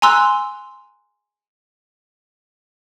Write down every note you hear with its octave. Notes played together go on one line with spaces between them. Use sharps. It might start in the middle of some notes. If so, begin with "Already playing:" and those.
G#5 A#5 C6 E6 F#6